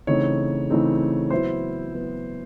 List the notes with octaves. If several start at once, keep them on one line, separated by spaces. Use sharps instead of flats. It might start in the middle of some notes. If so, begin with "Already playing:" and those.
C#3 E3 A3 C4 D#4 C#5
C#3 E3 A3 C4 D#4
F#3 B3 E4 C5
F#3 B3 E4